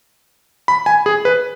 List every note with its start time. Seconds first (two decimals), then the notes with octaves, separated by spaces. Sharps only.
0.68 B5
0.86 G#5
1.06 G#4
1.25 B4